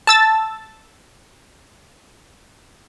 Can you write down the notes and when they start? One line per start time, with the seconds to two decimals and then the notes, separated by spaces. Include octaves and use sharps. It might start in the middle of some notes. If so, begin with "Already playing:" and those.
0.07 A5 E6 A6